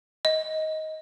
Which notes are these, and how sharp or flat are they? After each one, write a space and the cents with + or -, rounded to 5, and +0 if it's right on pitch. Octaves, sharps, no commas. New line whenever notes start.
D#5 +15